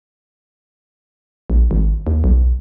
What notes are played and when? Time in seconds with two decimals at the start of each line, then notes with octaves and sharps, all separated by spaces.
1.50 A#1
1.71 G#1
2.07 D#2
2.24 B1